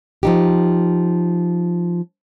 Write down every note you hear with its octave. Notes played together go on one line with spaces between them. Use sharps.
F3 D#4 G4